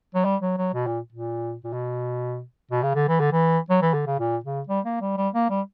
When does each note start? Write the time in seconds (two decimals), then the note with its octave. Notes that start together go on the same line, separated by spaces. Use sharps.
0.15 F#3
0.25 G3
0.42 F#3
0.58 F#3
0.74 B2
0.86 A#2
1.12 A#2
1.64 A#2
1.73 B2
2.71 B2
2.83 C#3
2.95 D3
3.08 E3
3.20 D3
3.32 E3
3.70 F#3
3.82 E3
3.94 D3
4.07 C#3
4.19 A#2
4.44 C#3
4.68 G3
4.85 A#3
5.01 G3
5.17 G3
5.34 A#3
5.49 G3